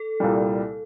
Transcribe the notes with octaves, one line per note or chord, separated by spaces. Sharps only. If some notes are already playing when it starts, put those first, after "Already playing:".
Already playing: A4
C2 A#2 G3